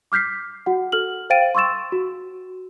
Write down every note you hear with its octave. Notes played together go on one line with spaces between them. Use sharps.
D6 F6 G6 B6 C7
F#4 F#5
A4 F6 F#7
C5 F5 G5 A6 D7 D#7
C6 C#6 E6 A6 E7
F#4